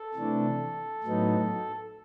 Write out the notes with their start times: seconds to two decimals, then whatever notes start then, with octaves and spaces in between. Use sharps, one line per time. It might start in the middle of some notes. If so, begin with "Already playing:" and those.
Already playing: A4
0.14 C3 E3 A3 D4
1.04 A2 F#3 B3 D#4